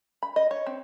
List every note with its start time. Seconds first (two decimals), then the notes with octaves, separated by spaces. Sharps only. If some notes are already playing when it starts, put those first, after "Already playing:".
0.23 B5
0.36 D#5
0.51 C#5
0.67 C4